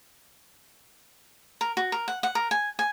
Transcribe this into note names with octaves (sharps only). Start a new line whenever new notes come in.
A#4
F#4
A#4
F#5
F#5
A#4
G#5
G#5